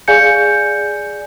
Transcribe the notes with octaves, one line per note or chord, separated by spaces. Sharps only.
G#4 D5 F5 G#5 G6 C#7